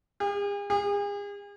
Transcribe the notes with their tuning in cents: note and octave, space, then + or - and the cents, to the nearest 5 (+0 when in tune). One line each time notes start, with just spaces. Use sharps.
G#4 -45
G#4 -40